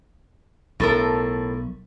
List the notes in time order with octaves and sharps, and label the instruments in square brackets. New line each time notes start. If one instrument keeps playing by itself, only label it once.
[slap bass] B1 [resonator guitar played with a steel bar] A2 A4 A#4